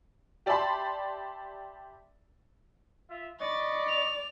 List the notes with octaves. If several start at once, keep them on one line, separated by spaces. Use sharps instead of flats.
G4 D5 E5 A5 B5 C6
F4 E5
D5 D#5 B5 C#6 A6
F7